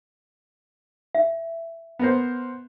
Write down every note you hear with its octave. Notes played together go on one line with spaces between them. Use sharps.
E5
B3 A#4 C5